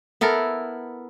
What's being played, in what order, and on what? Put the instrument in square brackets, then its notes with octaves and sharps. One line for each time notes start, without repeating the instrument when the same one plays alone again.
[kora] B3 E4 A4 A#4